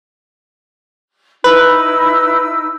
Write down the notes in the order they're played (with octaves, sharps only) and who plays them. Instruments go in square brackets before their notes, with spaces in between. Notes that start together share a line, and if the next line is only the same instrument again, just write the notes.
[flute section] D#4 E4 E6 [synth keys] B4